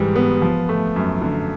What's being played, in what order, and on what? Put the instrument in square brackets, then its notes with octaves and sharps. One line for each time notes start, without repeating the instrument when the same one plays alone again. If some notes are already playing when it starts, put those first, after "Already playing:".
Already playing: [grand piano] G#2 E3 G3
B3
F3
A3
F#2
D3